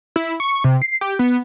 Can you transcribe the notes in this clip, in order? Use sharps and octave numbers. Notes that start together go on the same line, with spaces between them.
E4
C#6
C3
C7
G4
B3